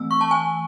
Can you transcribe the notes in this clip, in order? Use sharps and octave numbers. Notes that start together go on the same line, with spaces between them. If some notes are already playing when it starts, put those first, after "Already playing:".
Already playing: E3 A3 C4 E6
C#6
A5
G#5